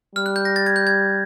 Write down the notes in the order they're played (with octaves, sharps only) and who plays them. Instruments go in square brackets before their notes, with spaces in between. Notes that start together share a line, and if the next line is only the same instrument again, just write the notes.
[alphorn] G3 [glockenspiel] F6
[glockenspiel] F#6
G6
A#6
A6
G#6
G6
G#6